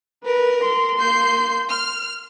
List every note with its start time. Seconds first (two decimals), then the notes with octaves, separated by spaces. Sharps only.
0.25 A#4 B4
0.65 C6
0.98 A#3 G6 C7
1.70 F6